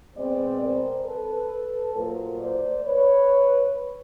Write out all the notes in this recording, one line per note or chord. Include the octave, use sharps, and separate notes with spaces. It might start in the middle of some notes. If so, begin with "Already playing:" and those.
B2 G#3 C4 C5 D5
A#4 C5
A4 B4
A#2 F#3 A3 A#4 C5
C5 D5
B4 C#5